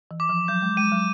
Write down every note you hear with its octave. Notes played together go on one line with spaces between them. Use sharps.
E3
D6
F3
F#3 G6
G#3
G#3 D#7
F#3